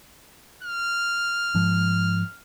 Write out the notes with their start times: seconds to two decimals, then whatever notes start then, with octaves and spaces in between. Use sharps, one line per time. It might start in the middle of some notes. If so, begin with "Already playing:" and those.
0.63 F6
1.55 G#2 F3